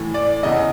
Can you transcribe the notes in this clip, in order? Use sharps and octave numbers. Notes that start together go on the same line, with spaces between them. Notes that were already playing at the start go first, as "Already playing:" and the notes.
Already playing: A2 E3
D5
E2 C#3 E3 D#5